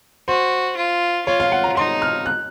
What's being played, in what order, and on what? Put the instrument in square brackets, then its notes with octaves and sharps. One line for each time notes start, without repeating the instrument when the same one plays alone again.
[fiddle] F#4 [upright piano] C5
[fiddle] F4
[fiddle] F4 [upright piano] C#5
[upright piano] F5
F#5
A#5
[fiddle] D#4 [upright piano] C6
[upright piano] F6
F#6